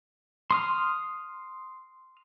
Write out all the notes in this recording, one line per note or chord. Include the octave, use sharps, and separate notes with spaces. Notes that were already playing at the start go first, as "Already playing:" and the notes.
C6 D#6 F6